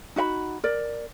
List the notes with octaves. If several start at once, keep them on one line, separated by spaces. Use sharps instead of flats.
D#4 F#4 E5 B5
A#4 D5